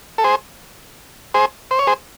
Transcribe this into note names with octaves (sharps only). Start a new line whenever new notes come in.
A4
G#4 C5
G#4 C5
C5
C#5
G#4 C5